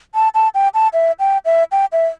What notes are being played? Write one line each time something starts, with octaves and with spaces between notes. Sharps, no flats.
A5
A5
G5
A5
E5
G5
E5
G5
E5